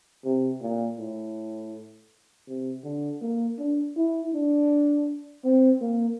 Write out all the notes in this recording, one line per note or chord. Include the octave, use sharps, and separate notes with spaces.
C3
A#2
A2
C3
D3
A#3
D4
E4
D4
C4
A#3